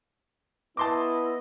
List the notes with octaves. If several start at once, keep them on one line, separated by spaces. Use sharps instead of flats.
B3 E4 D#5 A5 C6 D6